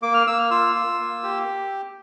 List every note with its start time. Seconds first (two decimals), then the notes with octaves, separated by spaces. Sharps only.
0.02 A#3 D6
0.14 F6
0.27 A#3 E6
0.39 F6
0.51 F4 E6
0.75 F4
1.00 A#3
1.23 G4